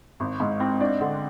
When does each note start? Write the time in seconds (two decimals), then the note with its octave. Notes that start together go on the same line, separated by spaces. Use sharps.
0.20 G#1
0.40 G#2
0.60 C4
0.80 D4
1.01 D3